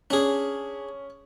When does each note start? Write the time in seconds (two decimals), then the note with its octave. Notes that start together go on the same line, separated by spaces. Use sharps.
0.10 C#4 D4 G#4